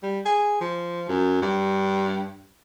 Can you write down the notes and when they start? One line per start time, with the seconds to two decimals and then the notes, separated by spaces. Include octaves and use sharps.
0.03 G3
0.25 G#4
0.61 F3
1.09 F#2
1.42 G2